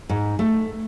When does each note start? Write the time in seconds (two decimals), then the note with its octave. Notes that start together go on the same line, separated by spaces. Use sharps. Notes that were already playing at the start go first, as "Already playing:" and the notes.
0.09 G#2
0.39 A3